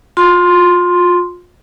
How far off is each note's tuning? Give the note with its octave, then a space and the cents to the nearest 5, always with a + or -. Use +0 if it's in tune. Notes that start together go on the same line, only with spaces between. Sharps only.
F4 +30 C6 +0